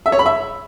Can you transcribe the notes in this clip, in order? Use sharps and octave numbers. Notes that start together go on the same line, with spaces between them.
E5
C#5
B5
E5